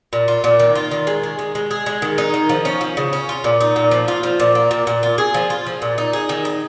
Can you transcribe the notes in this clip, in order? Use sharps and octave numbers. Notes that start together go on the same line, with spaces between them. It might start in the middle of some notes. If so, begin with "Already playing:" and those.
A#2
F4
A#2
D#3
F4
D#3
G#3
G#4
G#3
G#3
G#4
G#3
D#3
D#4
D#3
F3
C#4
F3
C#3
C#4
F4
A#2
D#4
A#2
F3
F4
F3
A#2
A#3
A#2
A#2
F4
G#4
F3
F4
F3
A#2
D#4
G#4
D#3
D#4